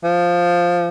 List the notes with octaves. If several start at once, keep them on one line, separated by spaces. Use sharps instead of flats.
F3